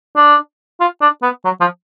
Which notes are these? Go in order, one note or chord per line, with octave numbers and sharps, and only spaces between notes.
D4
F4
D4
B3
F#3
F3